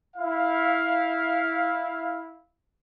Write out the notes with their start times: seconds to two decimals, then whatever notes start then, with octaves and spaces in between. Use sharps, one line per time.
0.17 E4 F5